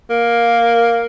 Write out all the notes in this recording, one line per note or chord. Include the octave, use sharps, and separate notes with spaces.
A#3